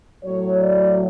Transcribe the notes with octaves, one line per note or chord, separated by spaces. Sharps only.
A2 F#3 A3 C#5
D5